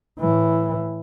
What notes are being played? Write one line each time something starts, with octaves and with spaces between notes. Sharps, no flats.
A2 E3